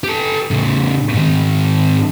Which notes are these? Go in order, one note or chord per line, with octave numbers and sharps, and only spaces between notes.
G4 A4
A2 C#3
G#2 D#3